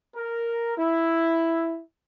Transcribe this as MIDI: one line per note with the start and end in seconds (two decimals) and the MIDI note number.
0.15 0.75 70
0.78 1.80 64